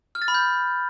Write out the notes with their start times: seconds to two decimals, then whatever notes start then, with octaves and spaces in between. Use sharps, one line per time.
0.15 F6
0.22 A6
0.28 B5
0.34 G6